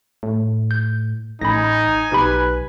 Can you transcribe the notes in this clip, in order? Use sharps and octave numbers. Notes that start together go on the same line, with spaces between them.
A2
G6
A1 D#4 G#5 B5 A#6
B1 D#4 G4 B4 B5